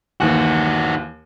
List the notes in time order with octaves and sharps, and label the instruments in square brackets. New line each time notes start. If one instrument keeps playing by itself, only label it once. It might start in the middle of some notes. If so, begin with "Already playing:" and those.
[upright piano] D#2 E3 [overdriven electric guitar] D#3 F#4